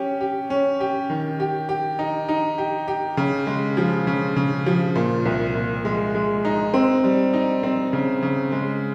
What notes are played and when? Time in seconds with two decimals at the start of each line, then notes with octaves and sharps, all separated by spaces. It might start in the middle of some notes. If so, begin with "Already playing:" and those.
Already playing: C#4 G4
0.21 G4
0.50 C#4
0.80 G4
1.10 D#3
1.40 G4
1.69 G4
1.99 D#4
2.28 D#4
2.58 G4
2.88 G4
3.17 C#3
3.47 G#3
3.77 F3
4.07 C#3
4.36 C#3
4.66 F3
4.96 A#2
5.26 C2
5.55 A#2
5.85 G#3
6.15 G#3
6.45 D#4
6.74 C4
7.04 G3
7.33 D#4
7.63 C4
7.93 C#3
8.22 C#3
8.52 G#3